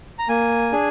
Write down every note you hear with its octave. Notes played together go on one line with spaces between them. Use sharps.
A#5
A#3 G#5
D4 G#4